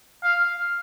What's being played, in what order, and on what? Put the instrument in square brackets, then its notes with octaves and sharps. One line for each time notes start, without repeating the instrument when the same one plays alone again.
[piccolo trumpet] F5